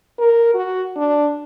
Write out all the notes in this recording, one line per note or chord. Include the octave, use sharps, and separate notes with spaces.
A#4
F#4
D4